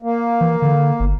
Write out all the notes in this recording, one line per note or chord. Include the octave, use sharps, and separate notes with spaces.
A#3
E3
D3
G1